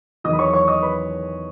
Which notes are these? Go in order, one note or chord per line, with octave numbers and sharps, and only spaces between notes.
E2 D#3 F#3 D#5 D#6
B5
C#5 C#6
C#5 C#6
D#5 D#6
B4 B5